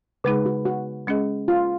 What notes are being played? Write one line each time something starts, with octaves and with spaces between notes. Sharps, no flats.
C#3 G#3 D#4 G#4 B4
F#4
F#4
G#3 C#4 G#4 D#5
F4